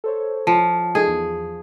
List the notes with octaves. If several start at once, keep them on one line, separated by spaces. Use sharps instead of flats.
A4 C5 C#5
F3
D#4 G#4 A4 D#5
E2